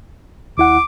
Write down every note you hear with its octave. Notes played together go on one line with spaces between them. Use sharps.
D#2 E4 F#5 D6